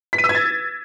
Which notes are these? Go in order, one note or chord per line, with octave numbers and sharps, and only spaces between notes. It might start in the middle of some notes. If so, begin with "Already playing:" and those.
B6
D#7
E6
G#6
A6